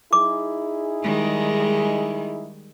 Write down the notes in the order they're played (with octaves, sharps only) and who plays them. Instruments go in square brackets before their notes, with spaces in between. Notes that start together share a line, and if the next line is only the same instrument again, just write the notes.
[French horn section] D#4 E4 G#4 [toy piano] D6
[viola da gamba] D#3 G3 G#3